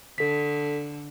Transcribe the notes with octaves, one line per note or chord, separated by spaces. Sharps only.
D3 A4 B6